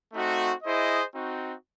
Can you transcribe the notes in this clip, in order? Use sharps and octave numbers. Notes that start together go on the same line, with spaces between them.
A3 C4 D#4 F#4
E4 G#4 C5 D#5
C4 D#4 F#4